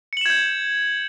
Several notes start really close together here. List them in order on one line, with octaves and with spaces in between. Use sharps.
C#7 F#7 E7 G#6 G6